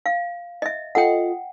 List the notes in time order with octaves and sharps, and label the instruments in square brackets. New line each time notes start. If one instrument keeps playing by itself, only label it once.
[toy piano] F5
D#5 E5
[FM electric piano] F4 A4 D#5 [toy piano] F#5 G5